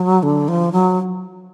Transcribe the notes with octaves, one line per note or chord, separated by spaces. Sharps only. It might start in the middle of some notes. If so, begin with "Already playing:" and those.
Already playing: F#3
D3
F3
F#3